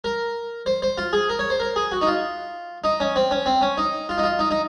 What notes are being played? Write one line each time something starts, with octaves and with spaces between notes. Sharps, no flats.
A#4
C5
C5
F4
G#4
A#4
C#5
C5
A#4
G#4
F#4
D#4
F4
D#4
C#4
C4
C#4
C4
C#4
D#4
F4
D#4
F4
D#4
D#4